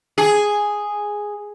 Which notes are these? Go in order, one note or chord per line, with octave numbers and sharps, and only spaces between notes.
G#4